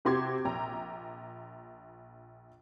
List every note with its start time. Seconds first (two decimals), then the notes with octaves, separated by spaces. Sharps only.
0.05 C3 F#4 G4 C6 D6 G#6
0.45 A#1 G5 A#5